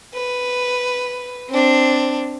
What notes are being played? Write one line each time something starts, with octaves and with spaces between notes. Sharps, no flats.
B4
C4 D4